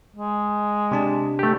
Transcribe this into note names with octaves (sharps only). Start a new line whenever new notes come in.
G#3
C3 D4 A5
A3 G4